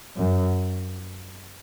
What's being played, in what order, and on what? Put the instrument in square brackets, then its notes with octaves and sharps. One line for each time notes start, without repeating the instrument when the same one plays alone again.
[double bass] F#2